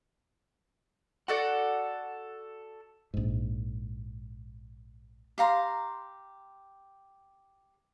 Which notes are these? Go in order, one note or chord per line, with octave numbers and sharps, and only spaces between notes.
F#4 A4 D5 F#5
A#1 G#2
G4 F5 A#5 C6